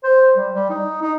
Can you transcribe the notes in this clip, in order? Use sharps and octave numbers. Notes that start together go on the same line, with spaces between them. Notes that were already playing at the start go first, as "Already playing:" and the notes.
C5
G3
G3
D#4
D#4